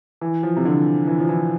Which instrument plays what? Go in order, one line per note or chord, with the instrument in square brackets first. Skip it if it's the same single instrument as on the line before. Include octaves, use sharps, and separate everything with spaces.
[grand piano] E3
F3
C3
D3
E3
F3
E3